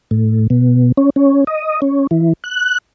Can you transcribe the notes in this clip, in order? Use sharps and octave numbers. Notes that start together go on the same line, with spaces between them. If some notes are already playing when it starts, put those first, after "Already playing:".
A2
B2
C#4
C#4
D#5
C#4
E3
F#6